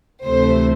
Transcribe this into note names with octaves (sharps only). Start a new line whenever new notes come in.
D2 C3 E3 A3 C5